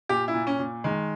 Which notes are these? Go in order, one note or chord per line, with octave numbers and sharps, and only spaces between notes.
A#2 G4
E4
A#2
C#4
A#2
D#3 G#3